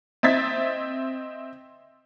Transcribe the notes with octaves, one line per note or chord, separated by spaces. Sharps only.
C4 D#5 E5 G#6 A6 B6